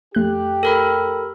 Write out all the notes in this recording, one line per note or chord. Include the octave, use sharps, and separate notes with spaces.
F2 A3 G4 F#6
A4 A#4 B5